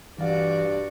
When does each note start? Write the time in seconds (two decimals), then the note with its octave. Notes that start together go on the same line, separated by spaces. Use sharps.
0.18 G2 E3 F#4 D5 F5